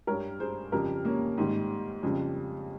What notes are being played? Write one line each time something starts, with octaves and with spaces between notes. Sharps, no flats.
G2 G3 A#4 C#5
G#4 C5
F2 C#3 G3 G4 A#4
A#3 C#4
G#2 D#3 G3
F2 C#3 G3